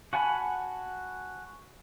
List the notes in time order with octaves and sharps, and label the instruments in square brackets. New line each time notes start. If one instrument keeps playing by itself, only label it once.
[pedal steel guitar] F#4 F#5 G#5 A5 B5